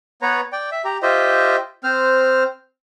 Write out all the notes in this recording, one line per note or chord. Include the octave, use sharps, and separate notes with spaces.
B3 B4 C#5 A#5
D5 G5
E5
G4 A#5
F4 G4 C5 D#5 E5
C4 C5 F6